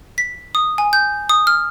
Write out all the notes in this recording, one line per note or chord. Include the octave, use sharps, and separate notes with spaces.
B6
D#6
G#5
G6
D#6
F6